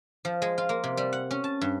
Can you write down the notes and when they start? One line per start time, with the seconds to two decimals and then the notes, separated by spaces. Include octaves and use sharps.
0.25 F3
0.42 G#3
0.58 F4
0.69 A#3
0.84 C3
0.97 G3
1.13 F#5
1.31 C#4
1.44 A5
1.61 G2